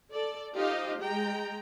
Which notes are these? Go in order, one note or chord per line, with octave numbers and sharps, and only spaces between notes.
A4 D5
D#4 F4 G4 C5 D#5 F5
G#3 G5 A#5